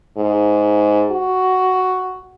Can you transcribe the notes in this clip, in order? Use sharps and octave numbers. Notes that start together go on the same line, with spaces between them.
G#2
F#4